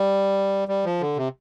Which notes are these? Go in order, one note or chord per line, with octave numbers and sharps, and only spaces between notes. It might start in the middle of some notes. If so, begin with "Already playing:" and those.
Already playing: G3
G3
F3
D3
C3